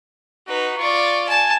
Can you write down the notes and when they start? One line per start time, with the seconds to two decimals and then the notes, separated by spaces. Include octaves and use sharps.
0.48 D#4 F#4 B4
0.77 F4 D5 C#6
1.28 G#5 A5